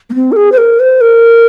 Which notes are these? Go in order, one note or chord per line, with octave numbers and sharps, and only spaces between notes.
A#3
C4
A#4
G#4
C5
A#4
C5
A#4